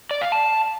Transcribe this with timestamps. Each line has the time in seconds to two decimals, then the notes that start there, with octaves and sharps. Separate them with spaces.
0.11 D5
0.21 F5
0.32 A5